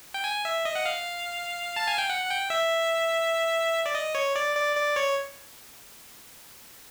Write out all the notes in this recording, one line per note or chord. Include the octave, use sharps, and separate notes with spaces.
G5
G#5
E5
D#5
F#5
F5
A5
G#5
G5
F#5
F#5
G5
E5
D5
D#5
C#5
D5
D5
D5
C#5